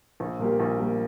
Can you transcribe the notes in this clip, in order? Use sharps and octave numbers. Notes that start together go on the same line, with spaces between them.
A#1
A#2 G3 A#3 G4
A#1
A#2 G3 A#3 G4